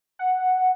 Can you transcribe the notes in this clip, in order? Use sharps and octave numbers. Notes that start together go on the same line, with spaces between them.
F#5